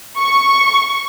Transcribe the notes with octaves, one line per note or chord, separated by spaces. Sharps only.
C#6